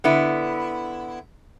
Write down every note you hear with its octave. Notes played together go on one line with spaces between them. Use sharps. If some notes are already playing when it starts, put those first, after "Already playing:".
D3 B3 E4